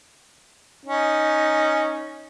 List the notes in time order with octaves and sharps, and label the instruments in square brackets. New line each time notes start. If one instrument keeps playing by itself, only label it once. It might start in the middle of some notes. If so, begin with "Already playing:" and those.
[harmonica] C#4 D#4